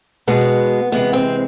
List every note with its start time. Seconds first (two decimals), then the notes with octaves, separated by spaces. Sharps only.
0.27 B2 G#3 B3
0.92 C3 E3 G#3 B3
1.13 C4